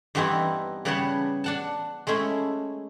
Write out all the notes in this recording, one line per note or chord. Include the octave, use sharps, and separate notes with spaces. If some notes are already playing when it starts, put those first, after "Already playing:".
G2 E3 B3 C4 D#4 E4
C#3 G3 B3 B4 C#5 A5
D4 F#5 A5
G#3 A3 C#4 E4